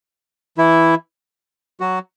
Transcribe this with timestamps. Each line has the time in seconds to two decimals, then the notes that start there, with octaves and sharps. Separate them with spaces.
0.58 E3 E4
1.80 F#3 F#4